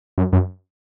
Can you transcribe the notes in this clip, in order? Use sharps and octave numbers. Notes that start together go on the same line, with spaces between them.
F#2
F#2